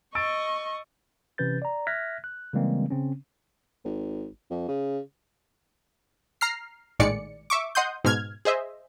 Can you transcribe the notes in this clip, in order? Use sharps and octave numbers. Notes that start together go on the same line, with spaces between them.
D#5 C#6 E6 A6 D7
C3 E3 C#4 B4 G6 A6
D5 A#5
E5 F6 F#6 G#6 A#6 B6
F#6
C#3 E3 G3 G#3 A#3 C4
C#3 C4 C#4
G#1
F2
C#3
A#5 F6 C7
A#1 A2 D#3 G#3 D5 C#7
E5 C#6 D6
D#5 F#5 C6 D#6 G6
G#2 B2 F6 G#6
G#4 C5 D#5 E5